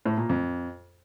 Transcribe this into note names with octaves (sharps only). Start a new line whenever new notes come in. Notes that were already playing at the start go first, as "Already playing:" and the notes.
A2
A#2
F2